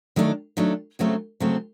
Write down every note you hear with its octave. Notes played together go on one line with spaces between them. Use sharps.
D#3 F#3 A3 D4
D#3 F#3 A3 D4
D2 C#3 F#3 A3 C4
D2 C#3 F#3 A3 C4